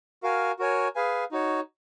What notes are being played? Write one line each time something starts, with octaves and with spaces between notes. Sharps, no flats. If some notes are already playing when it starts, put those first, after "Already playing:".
F#4 A#4 F5 G#5
F#4 A#4 C#5 G#5
G#4 B4 F5 G#5
D#4 F#4 C#5